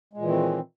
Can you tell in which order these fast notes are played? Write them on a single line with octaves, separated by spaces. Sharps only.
G#3 A#2 E3 D#3 C4